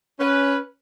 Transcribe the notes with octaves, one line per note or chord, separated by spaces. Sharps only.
C#4 B4